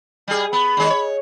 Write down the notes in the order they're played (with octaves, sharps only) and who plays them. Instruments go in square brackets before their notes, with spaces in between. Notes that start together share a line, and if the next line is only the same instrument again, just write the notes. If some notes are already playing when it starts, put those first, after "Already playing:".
[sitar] G3 G#4
[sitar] B3 [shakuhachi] B5
[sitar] D#2 G#3
C#5